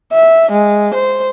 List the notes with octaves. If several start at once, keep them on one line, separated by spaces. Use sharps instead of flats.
E5
G#3
C5